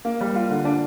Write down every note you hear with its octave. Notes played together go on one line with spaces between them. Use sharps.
A#3
G3
F4
D3
D4